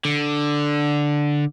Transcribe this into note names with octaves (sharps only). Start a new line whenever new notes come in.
D3